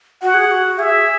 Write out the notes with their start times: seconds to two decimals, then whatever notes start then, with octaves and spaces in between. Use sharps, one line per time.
0.22 F#4 F#5
0.34 G#4
0.47 G#4
0.51 F#4
0.79 G#4 E5